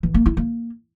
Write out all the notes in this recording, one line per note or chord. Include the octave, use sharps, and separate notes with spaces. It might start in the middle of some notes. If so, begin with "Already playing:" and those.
E3
A#3
E4
A#3